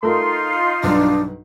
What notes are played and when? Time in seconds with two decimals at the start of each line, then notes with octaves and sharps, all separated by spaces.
0.03 A3 D#4 F4 A#4 C6
0.83 B1 G2 D4